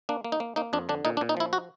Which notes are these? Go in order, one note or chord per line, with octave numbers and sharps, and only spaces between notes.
A#3 D4
A#3
D#4
A#3
A#3 D#4
F2 D4
D3 D4
A#2 D#4
D4
A#2
D#4
F3 E4
F#4